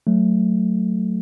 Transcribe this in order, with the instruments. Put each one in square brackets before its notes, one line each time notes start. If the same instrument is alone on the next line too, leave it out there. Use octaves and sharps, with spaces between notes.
[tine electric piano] F#3 A3